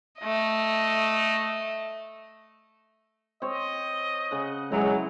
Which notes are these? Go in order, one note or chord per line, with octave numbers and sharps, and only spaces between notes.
A3 D#5
C4 C#5 D#5
C#3 F#5
F#3 G#3 E4 B4 E5